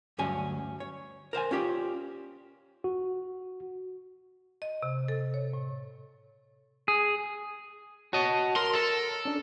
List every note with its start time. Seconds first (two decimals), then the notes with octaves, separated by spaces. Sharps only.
0.18 D2 G2 F#3 C#4 G#5
0.80 C#5
1.33 A#4 C5 F5 G#5
1.51 C#4 F4 G4 D5
2.84 F#4
4.62 D#5
4.82 C3
5.08 A4
5.34 C#5
5.53 A2
6.88 G#4
8.13 F#4 C#5 D#5 A5
8.56 A#4 C6
8.75 A4
9.25 C#4 D4